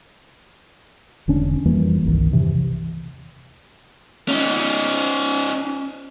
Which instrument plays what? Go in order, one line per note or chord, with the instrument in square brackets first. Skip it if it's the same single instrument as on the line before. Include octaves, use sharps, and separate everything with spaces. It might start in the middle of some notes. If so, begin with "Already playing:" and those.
[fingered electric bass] E1 D3 C#4 D4
F2 E3 G3 A#3
G1 C2 D#3
E2 G2 C3 E3
[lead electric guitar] C#4 D#4